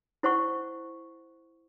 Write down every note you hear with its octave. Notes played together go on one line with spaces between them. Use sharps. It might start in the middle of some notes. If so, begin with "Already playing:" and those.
E4 C5 F#5 C#6